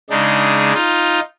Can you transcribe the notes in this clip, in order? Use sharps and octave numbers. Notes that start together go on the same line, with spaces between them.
C#3 G#3 D4 D#4
D#4 F4